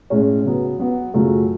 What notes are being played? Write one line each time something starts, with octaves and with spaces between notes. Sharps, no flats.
A2 G#3 C#4
C#3 F#3 B3
F#3 B3 F#4
F#2 C#3 F#3 A3 F4